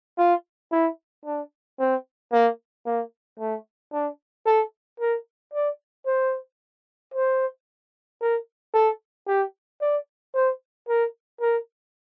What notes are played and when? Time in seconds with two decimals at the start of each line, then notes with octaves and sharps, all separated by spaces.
0.18 F4
0.72 E4
1.25 D4
1.80 C4
2.33 A#3
2.86 A#3
3.40 A3
3.93 D4
4.46 A4
5.00 A#4
5.54 D5
6.07 C5
7.14 C5
8.21 A#4
8.74 A4
9.27 G4
9.81 D5
10.35 C5
10.89 A#4
11.41 A#4